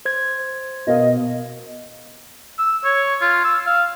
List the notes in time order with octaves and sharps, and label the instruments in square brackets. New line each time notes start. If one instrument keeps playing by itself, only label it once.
[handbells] C5 G#6
[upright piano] B2 A#4 F5 [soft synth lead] D#5
[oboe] E6
C#5
F4
E6
F5